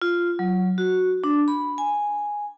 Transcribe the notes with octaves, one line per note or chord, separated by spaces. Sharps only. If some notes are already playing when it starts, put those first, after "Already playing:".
F4
F#3
F#4
D4
B5
G#5